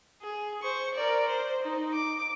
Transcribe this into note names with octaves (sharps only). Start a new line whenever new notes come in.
G#4
C5 C#6
A#4 D5
C5
D#4
D6